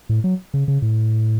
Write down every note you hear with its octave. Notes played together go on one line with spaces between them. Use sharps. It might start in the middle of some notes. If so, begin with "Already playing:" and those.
A2
F#3
C#3
C#3
A2